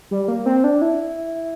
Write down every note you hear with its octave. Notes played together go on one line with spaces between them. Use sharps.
G3
A#3
C4
D4
E4